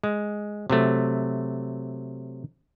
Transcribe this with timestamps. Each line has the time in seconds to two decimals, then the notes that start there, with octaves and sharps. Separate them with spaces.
0.04 G#3
0.70 C3 F#3 A3